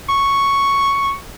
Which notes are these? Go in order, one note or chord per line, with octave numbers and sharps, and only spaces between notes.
C#6